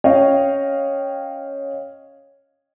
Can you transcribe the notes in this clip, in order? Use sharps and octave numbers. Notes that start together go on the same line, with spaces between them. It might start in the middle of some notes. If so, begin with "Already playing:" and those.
C#4 C#5 D#5 F5 G5